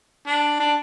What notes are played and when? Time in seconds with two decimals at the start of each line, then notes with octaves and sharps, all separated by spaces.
0.27 D4
0.60 D4